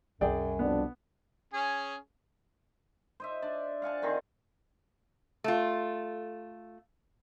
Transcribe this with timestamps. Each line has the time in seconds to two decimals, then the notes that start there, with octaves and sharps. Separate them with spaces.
0.21 C2 F#2 G3 G#4 D5 G5
0.59 F2 B2 B3 D4
1.53 C#4 G#4
3.20 C5 D#5 E5
3.42 D4 D5
3.82 F5 F#5 G#5 A5
4.02 D3 D#3 C4 G#4
5.44 A3 F4